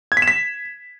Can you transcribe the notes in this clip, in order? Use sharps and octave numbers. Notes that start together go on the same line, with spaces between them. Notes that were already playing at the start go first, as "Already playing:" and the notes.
G#6
B6
E7
B6